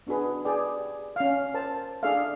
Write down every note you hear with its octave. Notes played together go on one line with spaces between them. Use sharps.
B3 D4 F#4 G#4 B4
G#4 B4 D5 G5
G4
C#4 F5
A#4 C5 A5
D4 G#4 A4 D5 E5 F5